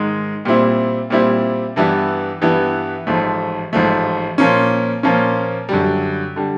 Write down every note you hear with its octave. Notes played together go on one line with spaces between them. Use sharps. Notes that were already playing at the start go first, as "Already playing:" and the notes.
Already playing: G#2 D#3 G#3
A#2 G3 C4 E4
A#2 G3 C4 E4
G2 E3 G3 B3 E4
G2 E3 G3 B3 E4
A1 G#2 F3 A3
A1 G#2 F3 A3
A#2 F3 A#3 C#4
A#2 F3 A#3 C#4
F#2 D3 G3
D3 G3